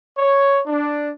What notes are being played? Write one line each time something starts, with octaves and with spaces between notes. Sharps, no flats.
C#5
D4